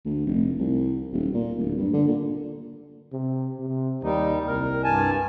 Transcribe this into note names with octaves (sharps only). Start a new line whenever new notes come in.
D2
F1
C2
D#1
A#2
D1
G2
D3
A#2
C3
C3
D#2 G3 D#4
C2 A#4
G2 G#5 A5